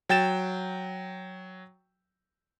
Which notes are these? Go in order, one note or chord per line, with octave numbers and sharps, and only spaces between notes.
F#3 G5 A6 E7